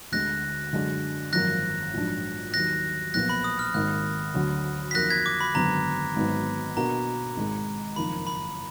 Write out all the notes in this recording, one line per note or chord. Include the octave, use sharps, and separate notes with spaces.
D2 D3 G#3 F#6 A#6
F#2 D3 G#3 D4 F#4
G#1 F#2 F3 A#3 F#6 A#6
A#1 G#2 F#3 D4
D#2 D#3 F#3 F#6 A#6
B1 A#2 F3 B3 F#6 A#6
B5
D#6
F6
G#1 G#2 D#3 A#3 F#6
D2 D3 F#3
B6
F2 D#3 F#3 A#3 F#6 A#6
G#6 B6
D6
B5
G#1 F#2 D3 F#3 B3 A#5
G#1 G#2 F#3 B3
B2 A#3 D4 F#4 A#4 A#5
G#1 G#2 D#3 G#3
F#1 F2 D#3 A#3 F4 B5
B5